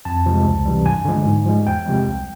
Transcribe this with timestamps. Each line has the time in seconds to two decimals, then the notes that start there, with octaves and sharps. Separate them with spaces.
0.05 F2 A5
0.26 C3 F3 G#3
0.45 C#2
0.66 C3 E3 G3
0.86 G2 G#5
1.05 D3 F3 G#3
1.26 G#2
1.46 F3 G#3
1.66 E2 G5
1.86 C3 F3 G#3
2.07 C2